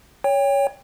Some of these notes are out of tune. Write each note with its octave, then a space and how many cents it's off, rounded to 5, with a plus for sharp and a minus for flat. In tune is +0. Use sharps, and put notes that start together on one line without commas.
C#5 +15 G5 +30